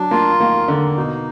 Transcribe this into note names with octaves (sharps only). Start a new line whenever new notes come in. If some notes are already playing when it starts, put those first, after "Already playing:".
Already playing: F#3 D4
A#3 F4
D#3 A#3
D3 A#3
B2 D#4